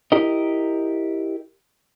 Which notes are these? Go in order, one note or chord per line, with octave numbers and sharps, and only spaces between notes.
E4 G4 A#4 D#5